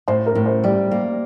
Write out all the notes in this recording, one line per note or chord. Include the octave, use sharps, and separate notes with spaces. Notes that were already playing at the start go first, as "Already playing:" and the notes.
A2 C5
A#4
A2
C5
G3 D5
A#3